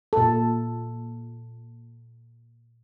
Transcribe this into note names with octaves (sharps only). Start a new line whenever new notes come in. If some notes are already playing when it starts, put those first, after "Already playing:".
A#2 A4